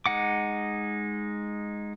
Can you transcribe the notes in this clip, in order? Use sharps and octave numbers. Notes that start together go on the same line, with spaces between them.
G#3 D#4 F#5 D6